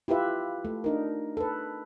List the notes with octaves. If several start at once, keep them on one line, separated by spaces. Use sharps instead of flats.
E4 F4 G4 B4 E5
A3
D4 D#4 A#4
A4 B4